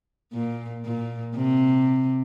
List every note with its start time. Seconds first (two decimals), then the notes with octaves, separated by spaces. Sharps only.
0.33 A#2
0.85 A#2
1.36 C3